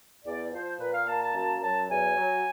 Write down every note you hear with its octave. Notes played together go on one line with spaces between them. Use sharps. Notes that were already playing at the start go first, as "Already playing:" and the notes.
E2 D5
F3 C5
A#2 B4
F5
A#3 A5
A5
F#2 A5
F#3 A5
E2 G#5
F#3